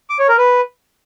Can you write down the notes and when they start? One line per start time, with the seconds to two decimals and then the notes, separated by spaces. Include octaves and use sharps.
0.10 D6
0.19 C#5
0.29 A#4
0.38 B4